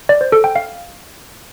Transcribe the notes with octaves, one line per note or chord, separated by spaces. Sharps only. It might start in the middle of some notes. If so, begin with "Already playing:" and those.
D5
C5
A4
G5
F5